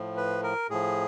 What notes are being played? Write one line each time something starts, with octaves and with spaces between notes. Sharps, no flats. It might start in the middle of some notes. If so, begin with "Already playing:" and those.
Already playing: A2 F3
B4
A#4
A2 F3 G#4